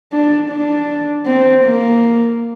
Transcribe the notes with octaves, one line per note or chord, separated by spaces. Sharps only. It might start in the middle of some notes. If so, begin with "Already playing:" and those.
D4
D4
C4
A#3